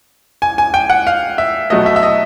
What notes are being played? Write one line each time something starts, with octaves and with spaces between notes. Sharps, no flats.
G#5
G#5
G5
F#5
F5
E5
B2 F#3 A3 D#5
E5
E5
D#5